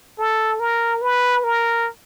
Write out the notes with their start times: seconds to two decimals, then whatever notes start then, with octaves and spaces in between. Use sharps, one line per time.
0.18 A4
0.60 A#4
1.02 B4
1.44 A#4